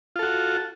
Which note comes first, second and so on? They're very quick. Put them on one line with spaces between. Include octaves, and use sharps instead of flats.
F4 A4 F#4